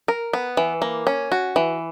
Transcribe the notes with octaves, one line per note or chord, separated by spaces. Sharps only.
A#4
B3
E3
A#3
C#4
F#4
E3